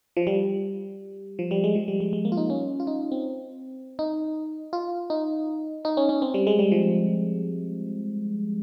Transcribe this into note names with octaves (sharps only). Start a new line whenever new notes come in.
F3
G3
F3
G3
G#3
F3
G3
G#3
G#3
A#3
F4
D#4
C#4
F4
D#4
C4
D#4
F4
D#4
D#4
C#4
C#4
C4
G3
G#3
G3
F3